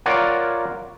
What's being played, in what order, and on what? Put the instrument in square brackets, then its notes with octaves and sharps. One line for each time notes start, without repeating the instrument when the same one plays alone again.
[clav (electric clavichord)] F4 A#4 C#5 D5 F#5